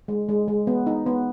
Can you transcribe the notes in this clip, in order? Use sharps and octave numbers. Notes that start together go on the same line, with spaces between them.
G#3
G#3
G#3
B3
D#4
B3